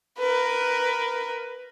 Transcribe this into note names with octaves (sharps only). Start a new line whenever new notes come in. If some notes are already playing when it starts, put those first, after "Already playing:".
A#4 B4